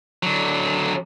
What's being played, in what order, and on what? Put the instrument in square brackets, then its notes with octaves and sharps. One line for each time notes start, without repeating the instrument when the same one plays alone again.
[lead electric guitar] D3 F#3